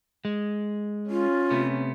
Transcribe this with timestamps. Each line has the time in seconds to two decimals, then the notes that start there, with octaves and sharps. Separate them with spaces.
0.25 G#3
1.10 C#4 F4
1.50 C3 A3 B3